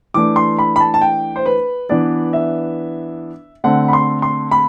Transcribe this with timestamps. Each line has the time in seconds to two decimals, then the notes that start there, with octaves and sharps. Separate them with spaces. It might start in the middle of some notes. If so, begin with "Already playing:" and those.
0.14 E3 A3 D4 D6
0.36 C6
0.59 B5
0.76 B5
0.80 A5
0.94 A5
1.01 G5
1.36 C5
1.46 B4
1.89 E3 B3 D4 D5
2.33 E5
3.64 D3 A3 C4 F#5
3.88 B5
3.93 C6
4.22 C6
4.51 B5